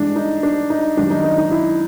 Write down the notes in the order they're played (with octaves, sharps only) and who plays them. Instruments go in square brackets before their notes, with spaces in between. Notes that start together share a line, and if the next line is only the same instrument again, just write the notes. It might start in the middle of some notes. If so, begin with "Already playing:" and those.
Already playing: [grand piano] G2 E3 G#3 D4
D#4
D4
D#4
F#2 D#3 G3 D4
D#4
D#4
D#4
E4